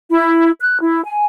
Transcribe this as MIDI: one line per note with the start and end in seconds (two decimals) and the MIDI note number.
0.11 0.51 64
0.60 0.80 90
0.81 1.03 64
1.04 1.24 80